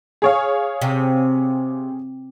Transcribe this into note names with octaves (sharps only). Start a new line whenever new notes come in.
G#4 C#5 F5
C3